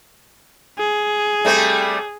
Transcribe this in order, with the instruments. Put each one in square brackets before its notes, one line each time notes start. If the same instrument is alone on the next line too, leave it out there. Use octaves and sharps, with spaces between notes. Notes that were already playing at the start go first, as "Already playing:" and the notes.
[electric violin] G#4
[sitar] G3 A3 C4